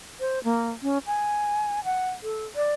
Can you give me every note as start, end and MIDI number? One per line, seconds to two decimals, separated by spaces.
0.20 0.39 72
0.44 0.70 58
0.82 0.98 61
1.07 1.84 80
1.84 2.10 78
2.23 2.46 69
2.56 2.74 74